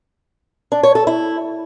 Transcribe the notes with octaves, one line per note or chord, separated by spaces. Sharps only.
D4
C#5
A4
E4